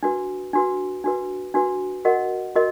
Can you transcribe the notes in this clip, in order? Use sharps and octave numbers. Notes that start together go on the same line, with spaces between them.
D4 F#4 B4
D4 F#4 B4
D4 F#4 B4
D4 F#4 B4
F#4 A#4 D#5 F#5
F#4 A#4 D#5